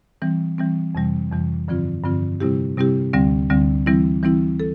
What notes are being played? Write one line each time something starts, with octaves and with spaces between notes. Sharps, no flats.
E3 G3 C4
E3 G3 C4
F2 C3 E3 G3
F2 C3 E3 G3
G2 D3 F3 C4 F4
G2 D3 F3 C4 F4
C3 G3 C4 E4 G4
C3 G3 C4 E4 G4
D2 D3 G3 C4
D2 D3 G3 C4
E3 G3 C4 E4
E3 G3 C4 E4
A4